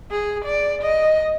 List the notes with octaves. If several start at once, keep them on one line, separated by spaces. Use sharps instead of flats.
G#4
D5
D#5